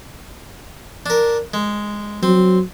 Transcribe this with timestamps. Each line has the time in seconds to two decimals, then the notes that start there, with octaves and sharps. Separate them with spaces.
1.06 D4 A#4
1.54 G#3
2.23 F#3 C4